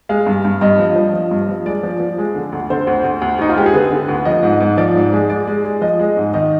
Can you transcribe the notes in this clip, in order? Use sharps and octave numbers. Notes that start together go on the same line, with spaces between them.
G#3 F5
G2
G2
G2 D#5
F3
F3
F3
G2
F3
G#3 D5
F3
F3
G#3
D3
D2
D3 C5
D2
D2
D2
D2 D#4
F4
G#3 G4
G#4
D3 B4
D3
D2
F3 D#5
G#2
G#2
F3 D5
G#2
G#3
G#3 D5
G#3
G#3
F3 D#5
G#3
G#2
D#3 D#5